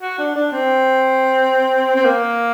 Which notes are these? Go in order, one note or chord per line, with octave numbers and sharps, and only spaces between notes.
F#4
D4
D4
C4
C4
A#3